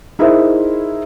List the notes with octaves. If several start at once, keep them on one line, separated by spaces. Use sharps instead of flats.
D#4 E4 G#4 A#4 C5 E5